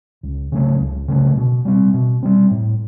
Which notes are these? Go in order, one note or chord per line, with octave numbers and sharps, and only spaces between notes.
C#2
C#3 F#3 A3
C#2
C#3 F#3 A3
B2
G3 C4
B2
G3 C4
A2